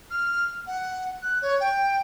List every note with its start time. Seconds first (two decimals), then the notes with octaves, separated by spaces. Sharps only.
0.11 F6
0.67 F#5
1.22 F#6
1.42 C#5
1.60 G5